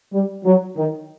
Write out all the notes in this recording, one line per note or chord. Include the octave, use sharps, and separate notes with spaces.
G3
F#3
D#3